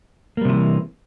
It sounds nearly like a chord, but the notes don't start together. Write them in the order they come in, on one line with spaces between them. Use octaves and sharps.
A#3 G3 C3 F3 E3